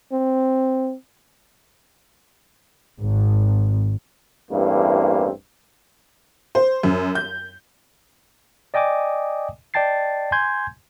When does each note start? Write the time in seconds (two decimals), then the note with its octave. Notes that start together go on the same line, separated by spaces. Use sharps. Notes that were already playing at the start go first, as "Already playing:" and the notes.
0.12 C4
3.00 G#1
4.51 A1 E2 G2 A#3 C4 E4
6.55 C5
6.83 F#2
7.15 G6
8.74 D5 D#5 G5 G#5 D6 D#6
9.74 D5 D#5 G5 A5 A6 C7
10.32 G#5 C6 G6 G#6